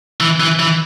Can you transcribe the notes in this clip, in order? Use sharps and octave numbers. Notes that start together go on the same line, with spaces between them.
E3
E3
E3